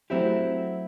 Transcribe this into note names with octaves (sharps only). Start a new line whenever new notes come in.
F#3 A3 C4 E4 G4